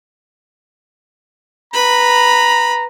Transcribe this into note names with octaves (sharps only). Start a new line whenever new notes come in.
B4 A#5 B5